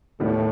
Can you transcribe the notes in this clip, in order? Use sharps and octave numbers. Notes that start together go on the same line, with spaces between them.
D#2 A2 D#3 G3 B3